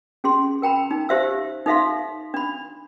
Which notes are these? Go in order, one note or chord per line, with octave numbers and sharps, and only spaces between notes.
C#4 G#4 C6
A#4 G5 A#5 B5
D#4
G4 C5 E5 F5 E6
D#4 A4 E5 F5 C6
D4 B5